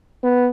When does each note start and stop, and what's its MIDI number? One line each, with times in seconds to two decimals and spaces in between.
0.24 0.49 59